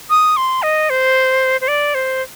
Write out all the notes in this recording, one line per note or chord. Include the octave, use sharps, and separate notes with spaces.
D#6
C6
D#5
C5
C5
D5
C5